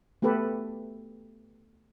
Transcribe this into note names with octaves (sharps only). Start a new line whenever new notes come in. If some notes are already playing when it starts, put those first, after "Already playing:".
A3 B3 G4 A4 B4